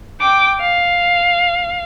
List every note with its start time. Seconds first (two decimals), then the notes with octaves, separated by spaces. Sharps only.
0.21 G5 D6
0.60 F5